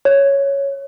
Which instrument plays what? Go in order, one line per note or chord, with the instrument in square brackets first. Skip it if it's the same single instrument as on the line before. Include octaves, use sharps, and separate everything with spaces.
[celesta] C#5